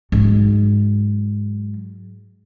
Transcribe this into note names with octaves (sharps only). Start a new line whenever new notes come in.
G#2 F#3